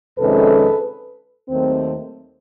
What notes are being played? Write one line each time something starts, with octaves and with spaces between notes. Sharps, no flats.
F2 C3 D#3 G#3 C#4 A4 B4
D#2 D#3 F#3 A3 C4